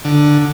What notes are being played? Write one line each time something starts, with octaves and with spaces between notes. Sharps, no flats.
D3